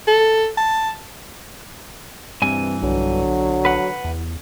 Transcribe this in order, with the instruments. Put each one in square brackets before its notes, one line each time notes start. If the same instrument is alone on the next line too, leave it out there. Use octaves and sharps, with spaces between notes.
[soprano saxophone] A4
A5
[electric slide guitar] G2 E3 G#5 [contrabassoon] C3
[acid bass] B1 [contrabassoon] D3 [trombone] F#3
[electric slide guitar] B4 F#5
[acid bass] E2